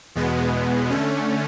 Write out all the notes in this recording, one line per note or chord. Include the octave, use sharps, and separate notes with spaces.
E2 B2 G#3 B3
D3 A3 C#4